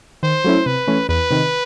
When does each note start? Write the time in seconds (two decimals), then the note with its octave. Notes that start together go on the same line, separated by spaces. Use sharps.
0.23 D#3 C5
0.44 F#3 A3 C#4 E4
0.66 C3 B4
0.87 E3 A3 C#4
1.09 E2 B4
1.31 C3 D#3